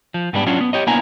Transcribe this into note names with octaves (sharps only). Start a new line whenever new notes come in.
F3
G#2 G3 A3 B3 D4 G4
F#3 C#4 D4 F4
B3
G4 C#5 D#5
A#3 B3 D4 E4 G#5 A#5